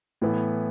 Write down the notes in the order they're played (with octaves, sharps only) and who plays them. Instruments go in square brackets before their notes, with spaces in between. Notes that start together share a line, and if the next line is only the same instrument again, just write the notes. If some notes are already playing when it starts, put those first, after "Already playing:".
[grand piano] A2 E3 B3